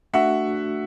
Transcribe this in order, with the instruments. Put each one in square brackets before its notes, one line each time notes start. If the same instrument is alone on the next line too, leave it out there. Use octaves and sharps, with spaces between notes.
[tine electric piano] A3 D4 F#4 [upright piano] E5 F#5